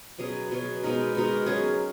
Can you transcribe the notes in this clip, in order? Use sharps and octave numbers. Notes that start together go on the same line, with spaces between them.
B2 F#3 C#4 G#4
B2 F#3 C#4 G#4
B2 G#3 D#4 A#4
B2 G#3 D#4 A#4
F#3 C#4 G#4